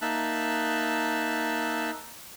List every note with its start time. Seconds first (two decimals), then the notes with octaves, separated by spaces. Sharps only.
0.02 A#3 D#4 E5 A5 F#6